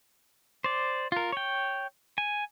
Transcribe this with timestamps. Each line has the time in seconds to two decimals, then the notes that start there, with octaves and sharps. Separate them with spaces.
0.64 C5 D5
1.12 F4 A#4
1.32 C#5 G5
2.18 G#5